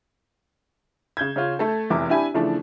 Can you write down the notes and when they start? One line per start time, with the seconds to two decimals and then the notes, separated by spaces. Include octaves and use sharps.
1.17 C#3 G6 G#6
1.36 C#3 C#4 F4
1.59 A3 A4
1.90 F1 E2 E4 D6
2.09 D4 E4 G4 E5 G#5 B5
2.34 C#3 E3 F3 A3 D4 E4